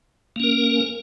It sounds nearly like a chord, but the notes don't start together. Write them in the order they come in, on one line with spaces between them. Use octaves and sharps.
A#3 C#4 A#4